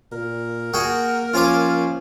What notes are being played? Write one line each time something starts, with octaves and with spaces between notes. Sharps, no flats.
A#2 A#4
A#3 F#4 G#4 G5
F3 C#4 F4 G#5 D6